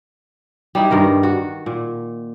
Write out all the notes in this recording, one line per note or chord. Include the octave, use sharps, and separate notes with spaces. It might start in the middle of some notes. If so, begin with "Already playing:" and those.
G3 D#4 E4
G2 D#3 A#4 D#5
F#4
A#2